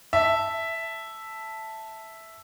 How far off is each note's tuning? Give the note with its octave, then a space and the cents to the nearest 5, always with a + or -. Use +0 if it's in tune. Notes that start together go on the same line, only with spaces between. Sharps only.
E5 +0 A5 +0